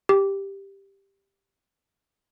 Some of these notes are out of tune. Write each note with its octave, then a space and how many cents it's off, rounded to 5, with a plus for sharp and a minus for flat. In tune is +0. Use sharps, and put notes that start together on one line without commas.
G4 +5